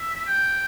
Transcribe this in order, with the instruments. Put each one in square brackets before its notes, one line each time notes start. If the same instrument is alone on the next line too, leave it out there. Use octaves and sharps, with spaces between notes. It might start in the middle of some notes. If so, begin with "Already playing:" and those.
Already playing: [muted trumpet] E5
G5